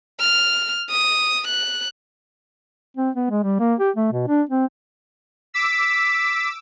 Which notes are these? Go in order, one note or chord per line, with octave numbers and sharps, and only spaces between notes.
F6
D#6
F#6
C4
B3
G#3
G3
A#3
G4
A3
B2
D4
C4
D6 E6 B6